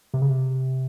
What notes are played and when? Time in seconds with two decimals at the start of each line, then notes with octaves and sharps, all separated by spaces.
0.14 C3
0.22 C#3
0.30 C3